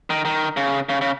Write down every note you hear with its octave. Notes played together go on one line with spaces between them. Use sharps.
D#3
D#3
C#3
C#3
C#3